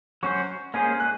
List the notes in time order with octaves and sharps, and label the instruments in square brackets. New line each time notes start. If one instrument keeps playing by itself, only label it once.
[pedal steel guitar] F#3 C#4 F#4 C5 [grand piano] C#6
[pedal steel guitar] A#3 C#4 G#4 C5 [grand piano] G#5
[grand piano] F#6